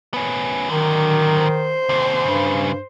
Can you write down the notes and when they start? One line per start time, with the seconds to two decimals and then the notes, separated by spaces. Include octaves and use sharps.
0.14 B3 C#4
0.69 D3 D#3 F#3
1.41 C5
1.89 D#2 C3
2.24 G2 C#3 G3